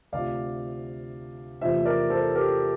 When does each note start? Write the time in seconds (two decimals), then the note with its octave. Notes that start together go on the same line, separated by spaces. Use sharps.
0.12 D2 C3 F3 D5 F5
1.61 E2 C3 F3 A3 C5 E5
1.85 A#4 D5
2.10 A4 C5
2.35 G4 A#4